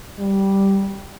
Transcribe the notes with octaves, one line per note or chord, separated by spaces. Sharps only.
G3